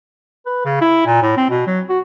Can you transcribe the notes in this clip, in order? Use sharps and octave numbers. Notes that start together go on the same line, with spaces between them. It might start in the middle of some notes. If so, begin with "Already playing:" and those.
B4
C#3
E4
A#2
A2
C4
B2
F#3
F#4